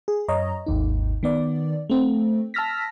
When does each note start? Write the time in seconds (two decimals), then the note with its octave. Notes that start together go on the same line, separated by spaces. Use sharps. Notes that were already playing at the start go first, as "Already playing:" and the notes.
0.08 G#4
0.28 F#2 C#5 D#5 A#5
0.66 G#1 D#2 D#4
1.23 D#3 B3 D5
1.90 A3 C4
2.54 A5 E6 F6 A#6 B6